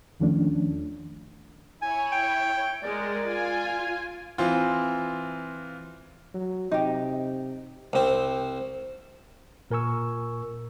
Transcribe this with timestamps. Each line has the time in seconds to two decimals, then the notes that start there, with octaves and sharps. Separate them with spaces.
0.20 E2 D#3 F3 A3 C#4 D4
1.82 E4 C#5 G#5
2.12 G5
2.83 G#3 A#4 D5
3.25 F4 G#5
4.38 E3 C4 F4
6.34 F#3
6.71 C3 D#4 G4
7.93 C2 C4
9.70 A#2 A#4 G#5 C#6 E6